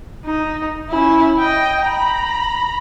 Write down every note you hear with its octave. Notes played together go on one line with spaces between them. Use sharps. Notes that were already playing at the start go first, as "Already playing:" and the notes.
D#4
C#4 E4
D#5 G5
A#5 B5